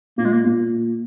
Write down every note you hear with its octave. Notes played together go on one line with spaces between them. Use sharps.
A#2 A#3
G#3
A#3
A#2